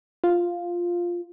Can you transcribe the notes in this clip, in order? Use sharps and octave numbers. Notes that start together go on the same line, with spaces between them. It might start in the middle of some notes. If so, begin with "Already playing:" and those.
F4